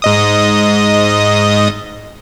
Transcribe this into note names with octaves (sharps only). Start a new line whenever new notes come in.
G#2 D#5 D#6